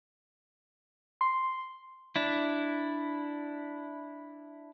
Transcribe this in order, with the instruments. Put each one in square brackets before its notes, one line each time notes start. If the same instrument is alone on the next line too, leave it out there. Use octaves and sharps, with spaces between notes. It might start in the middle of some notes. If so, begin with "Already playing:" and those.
[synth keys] C6
[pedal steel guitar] D4 E4